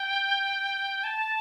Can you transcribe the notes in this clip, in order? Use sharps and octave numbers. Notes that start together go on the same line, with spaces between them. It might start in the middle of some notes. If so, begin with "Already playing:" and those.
Already playing: G5
A5